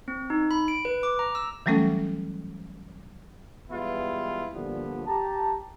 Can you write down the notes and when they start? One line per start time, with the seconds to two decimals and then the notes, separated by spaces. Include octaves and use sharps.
0.08 C4
0.30 D#4
0.51 B5
0.68 D7
0.85 B4
1.03 D6
1.19 A#5
1.35 E6
1.66 E3 F#3 G3 A3 C#4 A4
3.69 E3 G3 G#3 B3 E4 F4
4.53 A#2 D3 F3 G3 B3
5.06 G4 A5 A#5